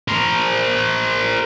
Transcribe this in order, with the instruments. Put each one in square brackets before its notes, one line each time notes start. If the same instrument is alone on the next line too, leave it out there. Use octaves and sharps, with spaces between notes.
[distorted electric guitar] A#4 C5